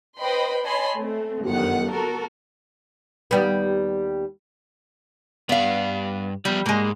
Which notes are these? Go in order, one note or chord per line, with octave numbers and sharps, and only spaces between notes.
B4 C5 D#5 G5 B5 C6
C#5 D#5 G#5 A5 B5 C6
A3 C4
G1 F#2 D#3 F#5
B3 F#4 A4 A#4
D#2 G3 B3
G2 B3 D5 F5
F3 G3 B3 D5
G#2 G#3 A#3